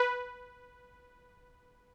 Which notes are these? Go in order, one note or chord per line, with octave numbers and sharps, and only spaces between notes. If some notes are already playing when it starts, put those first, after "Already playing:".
Already playing: B4